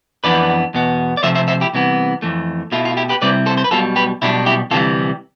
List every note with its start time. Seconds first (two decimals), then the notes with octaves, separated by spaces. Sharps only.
0.24 F2 E3 B3 D4 B4 D5
0.74 E2 B2 B3
1.17 D5
1.23 C3 F3 A3 C5 E5
1.35 C5 E5
1.48 C5 E5
1.61 E4 G4
1.73 C2 C3 E3 B3
2.22 F2 E3 A3
2.72 B2 A3 E4 F4
2.85 F4
2.97 E4 G4
3.09 G4 B4
3.22 C3 G3 C4 E4 B4 D5
3.46 A4 C5
3.57 C5
3.64 B4
3.71 B1 B2 G3 F4 A4
3.96 G4 B4
4.22 B1 B2 G3 D4 E4
4.46 E4 G4
4.71 D2 C3 E3 G3 F4 A4